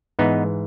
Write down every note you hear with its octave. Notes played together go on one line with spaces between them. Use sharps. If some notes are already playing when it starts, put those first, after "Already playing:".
G#2 E3 B3 D#4